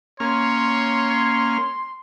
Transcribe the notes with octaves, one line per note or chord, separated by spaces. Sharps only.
A#3 C#4 C#5 C6 F6